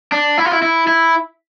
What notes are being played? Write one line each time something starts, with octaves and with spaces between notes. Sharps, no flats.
D4
E4
F4
E4
E4
E4